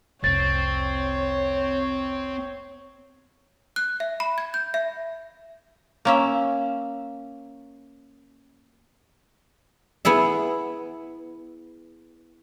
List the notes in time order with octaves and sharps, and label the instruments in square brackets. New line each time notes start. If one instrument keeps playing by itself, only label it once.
[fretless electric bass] F1 C2 [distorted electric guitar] C4 [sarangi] C#5 [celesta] A6
[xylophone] F#6
E5
B5
G#6
G6
E5
[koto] A#3 C#4 E5
[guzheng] B3 E4 G#4 E5